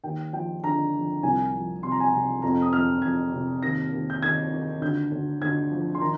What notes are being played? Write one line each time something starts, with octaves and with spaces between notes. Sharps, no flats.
D#2 G5
F3 G5
D3 A#5
F3
C2 G#5
F3
C3 C6
A#5
G#5
A#5
C3
F2 A#5
D#6
F2 F6
F2 G#6
C3
D#2 A#6
D#2
G6
D#2 G#6
D#3
D2 G6
D2
D2 G#6
F3
C6
D#3 A#5